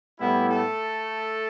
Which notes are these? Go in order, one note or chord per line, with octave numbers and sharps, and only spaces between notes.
A2 G3 B3 E4
A3 A4